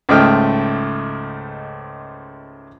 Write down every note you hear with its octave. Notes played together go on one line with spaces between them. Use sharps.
C#2 G#2 A3 D#5 G5 F6